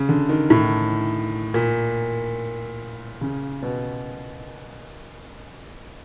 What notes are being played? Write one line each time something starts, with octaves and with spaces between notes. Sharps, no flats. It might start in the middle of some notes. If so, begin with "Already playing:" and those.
Already playing: C#3
D3
D#3
A2
A#2
C#3
B2